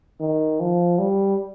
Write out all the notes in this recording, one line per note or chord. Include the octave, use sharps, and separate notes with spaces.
D#3
F3
G3